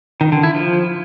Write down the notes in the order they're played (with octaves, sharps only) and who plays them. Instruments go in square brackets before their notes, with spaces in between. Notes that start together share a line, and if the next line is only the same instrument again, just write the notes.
[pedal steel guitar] D#3
D3
E4
F3